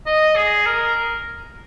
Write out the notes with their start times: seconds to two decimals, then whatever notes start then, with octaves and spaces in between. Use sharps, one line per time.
0.06 D#5
0.36 G#4
0.66 A#4